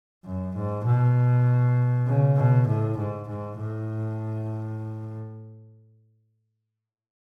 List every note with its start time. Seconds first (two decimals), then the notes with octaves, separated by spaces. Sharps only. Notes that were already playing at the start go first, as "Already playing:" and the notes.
0.25 F#2
0.56 G#2
0.86 B2
2.07 C#3
2.37 B2
2.68 A2
2.98 G#2
3.28 G#2
3.59 A2